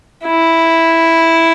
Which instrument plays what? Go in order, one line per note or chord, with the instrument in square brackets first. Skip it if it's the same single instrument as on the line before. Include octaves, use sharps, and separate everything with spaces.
[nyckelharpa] E4